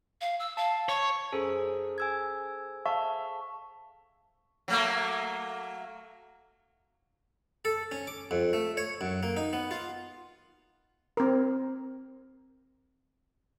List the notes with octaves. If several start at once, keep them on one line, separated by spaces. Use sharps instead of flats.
F5
E6
F5 A5
C#5 C#6
F#2 G#4 A4 C5
G#5 E6 G#6
E5 F5 A5 C#6
F#3 A3 A#3
A4
C#4
D6
F2
A3
C#5
F#2
A#3
D#4
B3
F4
C4 A#4